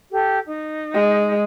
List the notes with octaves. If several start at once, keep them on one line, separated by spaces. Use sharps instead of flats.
G4 A4
D#4
G#3